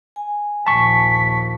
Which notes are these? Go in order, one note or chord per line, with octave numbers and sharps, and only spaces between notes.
G#5
A#1 D#2 A5 C#6 B6